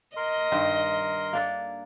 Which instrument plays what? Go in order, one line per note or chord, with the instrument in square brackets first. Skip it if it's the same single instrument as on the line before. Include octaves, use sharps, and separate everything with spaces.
[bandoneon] A#4 C6 [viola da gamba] D#5
[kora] G2 D#3 C5
A#3 D4 A4